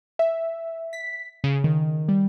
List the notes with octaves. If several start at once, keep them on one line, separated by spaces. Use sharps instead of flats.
E5
B6
C#3
D#3
G3